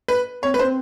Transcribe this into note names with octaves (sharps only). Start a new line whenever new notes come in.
B4
C4 C#5
B4
D4 C5
C4